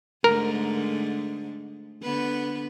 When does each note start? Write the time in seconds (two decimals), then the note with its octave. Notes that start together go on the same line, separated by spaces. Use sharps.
0.24 G#2 D3 A3 A#4
2.03 D3 B3 B4